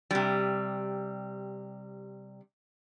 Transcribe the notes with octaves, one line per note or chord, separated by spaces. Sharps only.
C3 G3